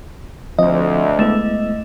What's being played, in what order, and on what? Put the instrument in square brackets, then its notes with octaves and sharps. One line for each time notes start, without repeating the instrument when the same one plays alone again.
[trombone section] D2 [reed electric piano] F3 C4 [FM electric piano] D#5
[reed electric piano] G#3 B3 E4 [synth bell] A3 E7